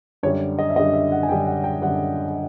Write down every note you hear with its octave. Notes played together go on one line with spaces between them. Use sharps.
F#2 D3 G3 C#5
D#5
E5
F#2 D3 G3 D#5
E5
F#5
G#5
F#2 D3 G3 G5
F#5
G5
F#2 D3 G3 F#5